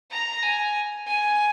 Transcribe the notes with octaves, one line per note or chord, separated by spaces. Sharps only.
A#5
G#5
G#5